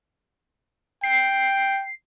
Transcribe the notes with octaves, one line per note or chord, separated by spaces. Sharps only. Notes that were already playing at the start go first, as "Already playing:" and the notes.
G5 C7